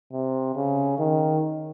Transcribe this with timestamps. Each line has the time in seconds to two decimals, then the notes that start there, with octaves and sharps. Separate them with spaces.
0.12 C3
0.55 C#3
0.99 D#3